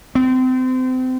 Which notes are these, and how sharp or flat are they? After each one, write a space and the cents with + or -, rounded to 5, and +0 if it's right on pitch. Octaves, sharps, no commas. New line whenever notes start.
C4 -30